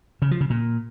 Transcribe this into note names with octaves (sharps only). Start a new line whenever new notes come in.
C#3
F3
C#3
A#2